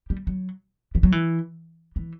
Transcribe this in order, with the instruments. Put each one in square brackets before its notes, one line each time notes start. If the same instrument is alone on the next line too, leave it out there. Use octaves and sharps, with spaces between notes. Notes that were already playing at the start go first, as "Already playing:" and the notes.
[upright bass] G3
F#3
E3
F#3
E3
E3